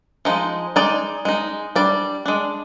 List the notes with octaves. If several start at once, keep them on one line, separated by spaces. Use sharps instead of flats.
F3 G#3 D#4
G#3 D#4 D5
G#3 D#4
G3 D4 D5
G#3 D4